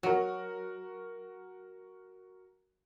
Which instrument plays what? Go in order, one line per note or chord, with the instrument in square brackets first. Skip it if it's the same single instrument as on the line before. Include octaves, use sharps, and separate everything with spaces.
[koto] F#3 [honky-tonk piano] F#4 A#4